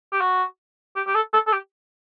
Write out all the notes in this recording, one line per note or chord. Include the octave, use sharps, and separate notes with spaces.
G4
F#4
G4
G4
A4
A4
A4
G4